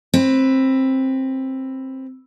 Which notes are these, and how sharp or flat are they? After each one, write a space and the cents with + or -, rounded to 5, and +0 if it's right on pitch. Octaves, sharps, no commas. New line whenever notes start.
C4 +15 B4 +5